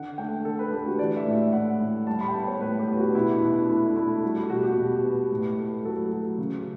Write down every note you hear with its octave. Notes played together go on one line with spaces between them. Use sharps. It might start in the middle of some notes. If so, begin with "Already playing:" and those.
Already playing: D3 F#5
A3 G5
D3 A4
B4
A3 G4
F#4
E3 D5
E5
A2
E5
A2 F#5
A2
G3 A5
B5
G5
B3 A5
C#5
A2 B4
G4
B3
F#4
D4
B2 E4
E4
B2 D4
D4
A3 E4
A3 E4
G3 F#4
G4
B2 F#4
G4
B2
B3
A2
A3
F#3 A4
F#3
C#3